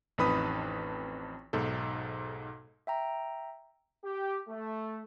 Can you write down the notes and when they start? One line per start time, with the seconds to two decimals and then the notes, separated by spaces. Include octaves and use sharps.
0.18 A1 F2 D#4 B4 B5 D#6
1.53 B1 G#2 A4
2.87 E5 G5 A#5
4.04 G4
4.48 A3